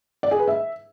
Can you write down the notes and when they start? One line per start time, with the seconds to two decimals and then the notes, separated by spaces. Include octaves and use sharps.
0.23 D5
0.31 G#4
0.39 B4
0.48 E5